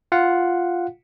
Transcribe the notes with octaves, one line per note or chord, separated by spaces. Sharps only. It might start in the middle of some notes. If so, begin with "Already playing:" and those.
F4 F5 F#5